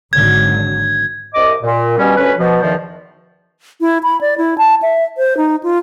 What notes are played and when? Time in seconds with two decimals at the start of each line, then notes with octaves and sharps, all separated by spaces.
0.13 G#1 D3 F#3 G#6
1.34 C2 D#5 D6
1.63 A#2
1.98 B2 G3 C#4
2.16 D2 C#4 B4
2.38 B2 F3
2.61 E2 D#3 F3
3.81 E4
4.03 B5
4.21 D5
4.38 E4
4.58 A5
4.82 E5
5.18 C5
5.37 D#4
5.63 F4